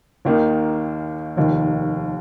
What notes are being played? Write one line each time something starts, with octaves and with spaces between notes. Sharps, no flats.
D#2 D#3 A#3 D#4
F1 D#2 D#3